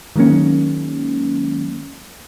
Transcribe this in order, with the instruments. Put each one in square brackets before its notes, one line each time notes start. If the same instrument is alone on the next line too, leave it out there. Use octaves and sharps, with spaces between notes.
[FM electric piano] D#3 F#3 G#3 A#3 C#4